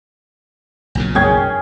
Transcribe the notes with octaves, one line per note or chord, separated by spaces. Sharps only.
B1 A#2 C#3
F#1 C#4 G#4 G5 G#6